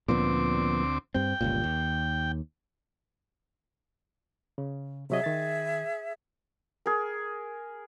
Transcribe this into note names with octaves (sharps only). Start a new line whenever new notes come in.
D2 A#2 F3 B3 C4 D6
G2 C4 G5
G1 C#2 A#2
D#2
C#3
C3 F#3 G#4 D#5 E5
D#3 A6
G#4 A#4